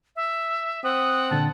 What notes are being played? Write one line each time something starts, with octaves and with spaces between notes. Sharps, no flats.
E5
C4 F#5 D#6
A#2 D3 A5